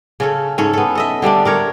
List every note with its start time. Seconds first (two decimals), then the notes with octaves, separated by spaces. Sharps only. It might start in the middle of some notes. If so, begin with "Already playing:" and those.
0.20 C#3 C#4 A4
0.58 G#2 C#4 A4
0.73 B3 A4
0.95 A4 D#5 E5
1.22 D3 G3 A3 D4
1.45 D4 A#4 C#5